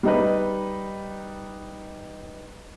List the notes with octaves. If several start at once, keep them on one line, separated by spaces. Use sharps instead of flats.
G3 D#4 B4